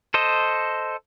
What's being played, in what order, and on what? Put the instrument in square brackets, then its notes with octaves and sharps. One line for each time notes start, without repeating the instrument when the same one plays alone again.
[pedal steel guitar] A4 C5 D#5